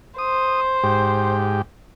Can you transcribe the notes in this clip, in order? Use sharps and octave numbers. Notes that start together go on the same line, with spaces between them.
C5 D#6
G#2 G4